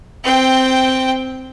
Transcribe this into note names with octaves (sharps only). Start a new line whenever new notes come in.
C4 G5